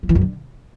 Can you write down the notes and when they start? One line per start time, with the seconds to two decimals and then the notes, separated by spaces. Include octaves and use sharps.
0.03 F3
0.09 E3
0.15 F#2
0.21 D3